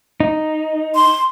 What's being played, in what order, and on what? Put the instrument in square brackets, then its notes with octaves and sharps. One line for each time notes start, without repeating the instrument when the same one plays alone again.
[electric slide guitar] D#4
[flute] C6